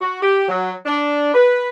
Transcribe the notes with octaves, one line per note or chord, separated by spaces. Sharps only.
F#4
G4
F#3
D4
B4